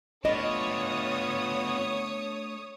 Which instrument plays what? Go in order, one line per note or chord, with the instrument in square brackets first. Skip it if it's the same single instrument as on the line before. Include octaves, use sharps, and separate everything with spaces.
[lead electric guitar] A3 D4 [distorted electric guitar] B3 F4 [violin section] C#5 D#6 [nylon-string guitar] D#5